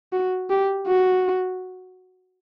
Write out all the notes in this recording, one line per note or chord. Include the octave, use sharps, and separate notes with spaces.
F#4
G4
F#4